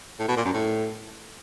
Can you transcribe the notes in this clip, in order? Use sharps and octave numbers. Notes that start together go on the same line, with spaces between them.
A2
B2
A#2
F#2
A2